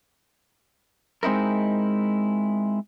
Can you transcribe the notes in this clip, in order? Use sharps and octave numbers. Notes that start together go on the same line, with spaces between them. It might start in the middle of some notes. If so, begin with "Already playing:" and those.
G#3 C4 D#4 E4 A#4